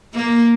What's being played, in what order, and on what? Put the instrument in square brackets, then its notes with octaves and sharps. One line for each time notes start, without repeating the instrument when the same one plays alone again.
[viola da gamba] A#3